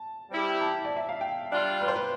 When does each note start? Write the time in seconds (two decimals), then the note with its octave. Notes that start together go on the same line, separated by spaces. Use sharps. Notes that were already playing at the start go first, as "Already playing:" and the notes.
Already playing: A5
0.30 G3 C4 E4 G4
0.60 A5
0.85 D5
0.96 E5
1.09 F5
1.21 G5
1.51 G3 D4 F4
1.81 B4
1.88 C5
1.96 B4